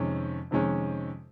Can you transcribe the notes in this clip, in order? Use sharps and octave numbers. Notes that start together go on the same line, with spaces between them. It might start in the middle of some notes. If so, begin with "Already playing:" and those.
Already playing: F2 C3 D#3 G#3 C#4
F2 C3 D#3 G#3 C#4